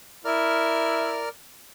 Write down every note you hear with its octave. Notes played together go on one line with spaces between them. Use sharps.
E4 A#4 D5 F6